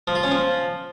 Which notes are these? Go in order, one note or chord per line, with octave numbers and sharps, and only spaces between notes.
F3
F4
C#4
F3